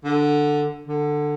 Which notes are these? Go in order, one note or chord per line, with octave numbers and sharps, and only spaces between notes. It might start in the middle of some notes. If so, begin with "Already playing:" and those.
D3
D3